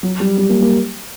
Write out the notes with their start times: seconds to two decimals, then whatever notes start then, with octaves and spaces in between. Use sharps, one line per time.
0.03 F#3
0.20 G3
0.38 G3
0.49 A#3
0.61 A#3